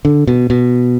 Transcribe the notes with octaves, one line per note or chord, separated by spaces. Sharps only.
D3
B2
B2